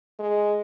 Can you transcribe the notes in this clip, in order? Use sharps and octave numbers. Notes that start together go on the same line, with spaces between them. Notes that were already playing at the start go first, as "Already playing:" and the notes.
G#3